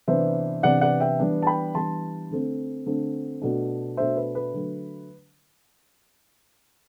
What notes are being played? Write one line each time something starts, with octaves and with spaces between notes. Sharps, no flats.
C3 E3 B3 D4 C5 E5
C3 E3 B3 D4 D5 F#5
D5 F#5
E5 G5
E3 G3 B3 D4
A5
G5 B5
E3 G3 B3 D4 A5 C6
D3 A3 C4
D3 A3 C4
B2 A3 D4
B2 A3 D4 C5 E5
B4
B4
D3 F#3 A3